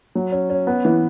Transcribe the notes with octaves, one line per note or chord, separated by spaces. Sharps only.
F#3
C#4
C#4
B3
E3